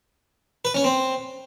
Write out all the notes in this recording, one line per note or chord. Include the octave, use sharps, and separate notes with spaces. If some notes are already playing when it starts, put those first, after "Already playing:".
B4
C#4
C4